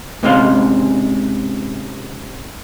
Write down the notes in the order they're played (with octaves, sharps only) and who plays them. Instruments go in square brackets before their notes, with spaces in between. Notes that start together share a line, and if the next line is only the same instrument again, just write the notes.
[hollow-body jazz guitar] G#2 C3 G#3 C#4 C5 F5